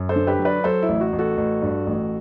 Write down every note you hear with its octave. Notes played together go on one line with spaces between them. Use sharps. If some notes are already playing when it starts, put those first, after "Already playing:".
Already playing: F#2
A4 C5
D3
G4 B4
F#3
B4 D5
F#3 A4 C5
E4
A1
F#4
A1
F#4 A4
A1
G2
A1